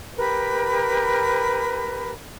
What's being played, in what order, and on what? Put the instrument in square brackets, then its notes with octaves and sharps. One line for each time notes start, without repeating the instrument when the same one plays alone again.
[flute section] G4 A#4 B4 B5